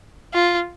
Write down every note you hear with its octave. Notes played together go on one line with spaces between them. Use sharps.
F4